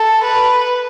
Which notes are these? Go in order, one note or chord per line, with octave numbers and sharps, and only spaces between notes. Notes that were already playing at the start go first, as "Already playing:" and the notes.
Already playing: A4
B4